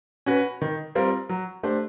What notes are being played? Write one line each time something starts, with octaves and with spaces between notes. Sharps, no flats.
C#4 F#4 B4
D#3
G3 C4 F4 A#4
F#3
A3 D4 G4 C5